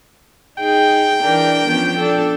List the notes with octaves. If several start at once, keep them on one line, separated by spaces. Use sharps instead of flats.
D#4 G#4 G5
E3 D4 A#4
F3 B3 C#4
D4 A4